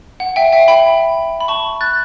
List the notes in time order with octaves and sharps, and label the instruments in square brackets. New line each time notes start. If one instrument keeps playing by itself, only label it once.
[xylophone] F#5
E5 G5
E5 G5
G5 B5
B5
A5 C#6
F#6 A6